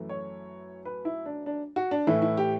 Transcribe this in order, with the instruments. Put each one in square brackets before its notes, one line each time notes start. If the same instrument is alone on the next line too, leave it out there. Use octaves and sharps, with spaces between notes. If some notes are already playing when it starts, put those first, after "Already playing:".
Already playing: [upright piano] F#2 E3 A3
C#5
B4
E4
D4
D4
F#4
D4
A2 E3 A3 E4
E4
G4